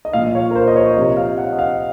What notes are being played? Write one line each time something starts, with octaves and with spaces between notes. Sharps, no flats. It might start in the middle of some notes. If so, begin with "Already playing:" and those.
D#5
A#2 F3 F5
C#5
A#4
C5
D#5
C#5
C3 F3 D#5
F5
F#5
D#5
F5